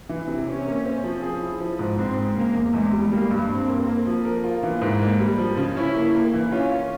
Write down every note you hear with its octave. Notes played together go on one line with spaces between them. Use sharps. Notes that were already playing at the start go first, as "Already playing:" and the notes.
E3
C3
C3 C#4
A#3
C4
F3
G#4
E4
F3
G#2
G#2 C4
G#3
C#3 A#3
E2
E2 G#3
G3
G3 A#3
G2
G2 C4
A#3
A#3
F3
A#4
F4
E3 A#3
G#2
G#3 A#3
G3
F3
C#3
C#4 E4
A#3
A#3
E3
C#4 F4
C#4